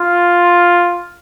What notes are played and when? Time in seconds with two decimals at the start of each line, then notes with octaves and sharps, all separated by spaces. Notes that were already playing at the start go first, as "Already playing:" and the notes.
Already playing: F4